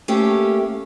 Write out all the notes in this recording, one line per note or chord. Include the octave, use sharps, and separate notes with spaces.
A3 A#3 C#4 G4